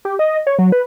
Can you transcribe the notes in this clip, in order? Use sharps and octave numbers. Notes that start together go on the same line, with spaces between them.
G4
D#5
C#5
F#3
B4